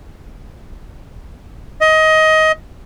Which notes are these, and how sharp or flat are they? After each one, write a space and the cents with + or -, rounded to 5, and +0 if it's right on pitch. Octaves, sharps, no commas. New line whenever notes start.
D#5 +20